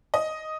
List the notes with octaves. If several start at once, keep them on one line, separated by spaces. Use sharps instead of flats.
D#5